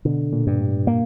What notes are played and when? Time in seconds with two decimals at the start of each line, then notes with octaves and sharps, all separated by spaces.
0.05 B2 D3
0.33 A#2
0.47 G2
0.60 A2
0.87 A#3